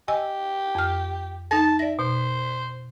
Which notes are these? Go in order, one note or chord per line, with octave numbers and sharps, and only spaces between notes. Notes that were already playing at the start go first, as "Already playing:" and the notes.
G4 D#5 G#5 E6
F2 F6
D#4 A5 A#6
D5 E5 A#6
B2 C5